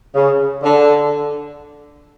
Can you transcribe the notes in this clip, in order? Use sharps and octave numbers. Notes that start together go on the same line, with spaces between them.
C#3
D3